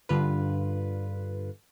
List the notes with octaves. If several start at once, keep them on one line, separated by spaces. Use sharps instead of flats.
G2 D3 F4 B4